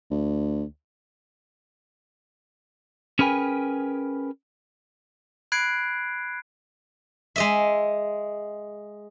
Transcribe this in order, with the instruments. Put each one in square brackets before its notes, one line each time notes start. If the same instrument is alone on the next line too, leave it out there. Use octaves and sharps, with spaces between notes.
[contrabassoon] D2
[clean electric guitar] C#4 G#4 A#4 B4 G5 G#5
[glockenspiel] B5 F#6 G#6 C7 D7
[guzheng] G#3 D#5 E5